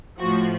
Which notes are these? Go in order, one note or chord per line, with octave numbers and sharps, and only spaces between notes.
A2 F3 F#4